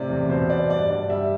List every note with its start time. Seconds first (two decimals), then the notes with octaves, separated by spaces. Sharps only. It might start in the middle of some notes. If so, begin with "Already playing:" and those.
Already playing: A2 C3 D5
0.10 E2
0.29 B2 C5
0.49 B3 D5
0.70 G2 D5
0.89 G2 D5
1.10 G3 E5